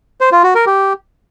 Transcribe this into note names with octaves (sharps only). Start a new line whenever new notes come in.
C5
F4
F#4
A#4
G4